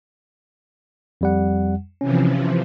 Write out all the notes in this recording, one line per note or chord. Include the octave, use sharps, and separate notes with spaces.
F2 G3 F#5
C3 E3 F3 C#4